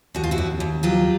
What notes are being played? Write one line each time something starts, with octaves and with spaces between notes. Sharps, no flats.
D#2 F#4
F4
E4 F#4
D#2
D#2
F#3 F4 G4